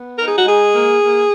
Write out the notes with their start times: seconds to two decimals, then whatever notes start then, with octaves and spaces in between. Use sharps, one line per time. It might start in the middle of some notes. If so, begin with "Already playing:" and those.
Already playing: B3
0.18 D#4 A#4
0.28 G#4
0.38 F#4
0.45 G#3 G#4
0.73 A#3
1.00 A#3